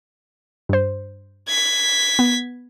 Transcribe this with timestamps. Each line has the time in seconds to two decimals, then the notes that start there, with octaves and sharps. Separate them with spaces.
0.69 G2 C5
1.48 G#6 B6
2.19 B3